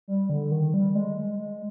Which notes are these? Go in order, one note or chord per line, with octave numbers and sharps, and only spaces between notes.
G3
D3
D#3
G3
G#3
G#3
G#3